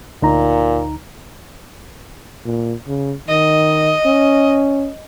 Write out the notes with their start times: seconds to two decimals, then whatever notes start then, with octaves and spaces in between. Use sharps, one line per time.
0.22 D2 A#2 D#4 A#5
2.45 A#2
2.87 C#3
3.28 D#3 D#5
4.06 C#4